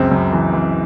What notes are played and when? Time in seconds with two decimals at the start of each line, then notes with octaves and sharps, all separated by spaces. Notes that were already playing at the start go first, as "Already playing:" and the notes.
Already playing: C#2 F#2 C4
0.12 F#2
0.33 E3
0.53 E3